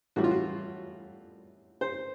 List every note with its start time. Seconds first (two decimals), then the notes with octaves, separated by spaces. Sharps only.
0.16 A2 E3 G3 F#4
0.24 F4
0.31 F#4
1.81 C5